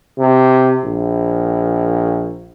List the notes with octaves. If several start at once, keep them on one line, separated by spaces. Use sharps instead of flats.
C3
A#1